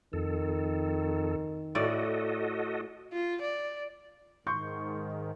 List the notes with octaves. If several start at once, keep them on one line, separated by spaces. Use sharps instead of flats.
F2 D#3 A4
A2 F#4 A4 D5 D#5
F4
D5
G#2 D#3 C6 C#6 G6